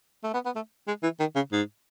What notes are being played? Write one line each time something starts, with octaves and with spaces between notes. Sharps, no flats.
A3
B3
B3
A3
G#3
E3
D#3
C#3
G#2